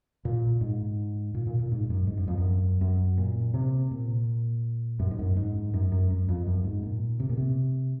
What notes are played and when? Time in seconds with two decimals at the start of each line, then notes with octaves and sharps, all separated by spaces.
0.25 A#2
0.61 G#2
1.34 A#2
1.47 A#2
1.59 A#2
1.72 G#2
1.90 F#2
2.07 G#2
2.17 F#2
2.28 F2
2.38 F#2
2.81 F#2
3.18 A#2
3.54 C3
3.91 A#2
4.99 F#2
5.11 G#2
5.19 F#2
5.36 G#2
5.74 F#2
5.92 F#2
6.10 F#2
6.29 F2
6.47 F#2
6.64 G#2
6.83 A#2
7.20 C3
7.29 A#2
7.37 C3